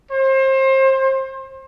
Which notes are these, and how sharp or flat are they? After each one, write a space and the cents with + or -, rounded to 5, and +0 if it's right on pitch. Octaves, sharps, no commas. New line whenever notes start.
C5 +30